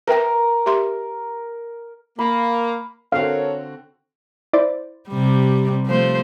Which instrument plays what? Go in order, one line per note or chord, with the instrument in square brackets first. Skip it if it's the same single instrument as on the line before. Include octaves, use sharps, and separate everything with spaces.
[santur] A#4 A#5 [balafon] B4 E5 G5
[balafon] G4 E5 C6
[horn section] A#3 [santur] B5
[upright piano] D3 C4 F#4 [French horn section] A4 A#4 C#5 [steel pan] F5
[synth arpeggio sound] E4 C5 D5
[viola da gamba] C3 G3
F3 A3 C5